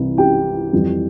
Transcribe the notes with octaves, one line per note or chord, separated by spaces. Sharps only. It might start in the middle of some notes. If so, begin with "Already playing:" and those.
Already playing: C2 C3 E3
G4 G5
F2 E3 G3